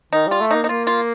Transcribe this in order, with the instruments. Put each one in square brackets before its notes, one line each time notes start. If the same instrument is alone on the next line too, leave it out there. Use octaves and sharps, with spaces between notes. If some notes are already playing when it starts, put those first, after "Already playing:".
[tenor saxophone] D#3 [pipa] D#4
[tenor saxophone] G3 [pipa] F4
[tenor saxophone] A3
[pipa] D#4
[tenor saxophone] A#3
[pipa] D#4
[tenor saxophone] A#3 [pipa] F4
[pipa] F4